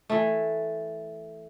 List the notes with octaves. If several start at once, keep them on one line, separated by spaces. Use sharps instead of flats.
E3 A3